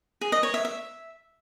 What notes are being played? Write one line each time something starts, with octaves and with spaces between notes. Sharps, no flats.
G#4
D#5
C#5
E5
E5